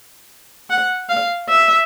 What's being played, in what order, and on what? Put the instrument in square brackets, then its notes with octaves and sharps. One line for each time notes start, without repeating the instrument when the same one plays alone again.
[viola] F#5
F5
E5